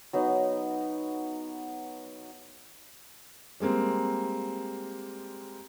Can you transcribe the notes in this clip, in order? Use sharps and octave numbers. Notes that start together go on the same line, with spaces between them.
F#3 B3 D#4
G3 G#3 A#3 C4